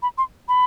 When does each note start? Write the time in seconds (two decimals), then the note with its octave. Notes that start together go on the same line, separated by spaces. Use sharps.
0.02 B5
0.18 C6
0.48 B5